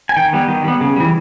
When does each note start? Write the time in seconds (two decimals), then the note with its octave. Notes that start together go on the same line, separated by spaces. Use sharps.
0.09 G#5
0.16 D#3 G5
0.33 G3 B3
0.48 D#3
0.64 G3 B3
0.81 C#3
0.96 E3 G3